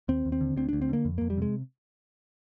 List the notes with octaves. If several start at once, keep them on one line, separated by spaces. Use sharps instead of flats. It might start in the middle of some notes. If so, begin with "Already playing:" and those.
D#2 C4
D#2
C4
D3
D2 C4
D2 D4
C4
D3 A#3
F2
F2 A#3
G3
C3 G#3